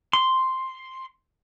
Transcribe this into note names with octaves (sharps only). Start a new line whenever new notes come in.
C6